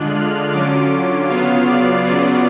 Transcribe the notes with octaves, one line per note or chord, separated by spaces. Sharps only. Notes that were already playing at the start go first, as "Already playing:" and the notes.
Already playing: D3 G#3 D4 F4 F#6
F6
D3 F#3 C#4 F4 D6
C#3 F#3 B3 F4 F5
D5
C#3 F#3 B3 F4 D5